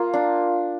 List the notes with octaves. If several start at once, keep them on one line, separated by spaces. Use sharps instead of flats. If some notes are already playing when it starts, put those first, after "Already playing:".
Already playing: A#3 F4
D4